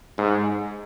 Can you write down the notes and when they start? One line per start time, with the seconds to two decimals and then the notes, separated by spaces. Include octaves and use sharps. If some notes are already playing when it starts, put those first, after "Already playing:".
0.18 G#2